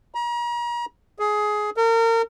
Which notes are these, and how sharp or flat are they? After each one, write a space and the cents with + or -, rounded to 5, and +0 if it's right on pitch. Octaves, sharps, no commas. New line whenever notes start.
A#5 +40
G#4 +15
A#4 -35